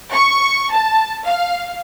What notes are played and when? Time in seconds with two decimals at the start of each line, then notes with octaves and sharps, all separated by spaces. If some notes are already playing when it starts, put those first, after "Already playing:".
0.13 C#6
0.72 A5
1.24 F5